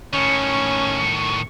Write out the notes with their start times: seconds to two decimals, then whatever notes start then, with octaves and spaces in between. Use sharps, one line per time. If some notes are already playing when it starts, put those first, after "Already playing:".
0.13 A2 D#3 C#4 C#6